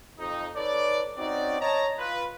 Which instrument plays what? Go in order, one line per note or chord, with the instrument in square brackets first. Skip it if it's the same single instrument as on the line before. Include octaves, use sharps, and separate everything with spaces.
[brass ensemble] F2 D#4
D#4 A4 B4 C#5 D5
C4 C#4 D#4 F#4 D5
C#5 D#5 A5 A#5
F4 B4